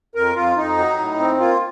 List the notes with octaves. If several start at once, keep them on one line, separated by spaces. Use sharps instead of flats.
F2 A#4
F2 F4
F2 D#4
F#3
A2
C4
A#3 F4